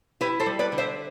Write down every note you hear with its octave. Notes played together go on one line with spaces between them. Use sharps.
E4 G4 B4
A4 C5
G3
B4 D5
D3
C5 E5